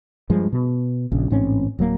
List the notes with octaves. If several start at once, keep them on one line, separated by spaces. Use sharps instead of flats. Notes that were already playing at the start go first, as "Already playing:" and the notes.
G2 F3 G#3
B2
A#1 C#3
A1 G#2 C4 C#4
D1 F#3 A#3